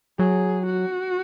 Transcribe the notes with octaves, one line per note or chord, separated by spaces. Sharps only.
F#3 G#4
F#4